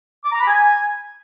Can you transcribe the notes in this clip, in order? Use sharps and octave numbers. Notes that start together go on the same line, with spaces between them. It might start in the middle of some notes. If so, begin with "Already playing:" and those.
D6
A#5
B5
G#5